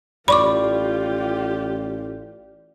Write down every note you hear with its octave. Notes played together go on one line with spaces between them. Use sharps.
A1 F4 G4 D5 B5 C#6 D6